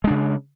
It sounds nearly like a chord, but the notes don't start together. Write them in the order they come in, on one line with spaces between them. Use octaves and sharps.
G#3 D4 C#3